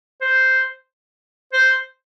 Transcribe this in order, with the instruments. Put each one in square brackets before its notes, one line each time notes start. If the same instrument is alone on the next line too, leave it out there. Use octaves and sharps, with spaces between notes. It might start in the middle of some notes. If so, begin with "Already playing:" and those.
[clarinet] C5
C5